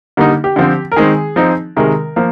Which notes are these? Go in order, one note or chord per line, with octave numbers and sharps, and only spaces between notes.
D3 G3 A#3 D#4
G4
D3 F3 C4
A#4
D#3 G#3 C4 D#4 G#4
F3 C4 D#4
C3 D#3 G#3 A#4
F3 A#3